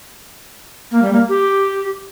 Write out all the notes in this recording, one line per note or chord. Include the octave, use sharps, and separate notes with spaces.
A#3
G3
A#3
G4